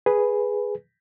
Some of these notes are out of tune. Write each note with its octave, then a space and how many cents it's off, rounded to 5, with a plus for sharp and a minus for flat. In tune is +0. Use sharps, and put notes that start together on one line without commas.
G#4 +0 B4 +0